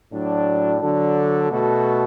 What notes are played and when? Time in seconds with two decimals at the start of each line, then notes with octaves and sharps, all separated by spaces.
0.11 A2 F#3 D4
0.80 D3 F#3 D4 A4
1.50 B2 A3 F#4 A4